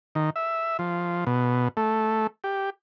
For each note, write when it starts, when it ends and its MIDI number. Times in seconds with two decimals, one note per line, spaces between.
0.15 0.30 51
0.36 0.77 76
0.79 1.24 53
1.27 1.68 47
1.77 2.27 57
2.44 2.70 67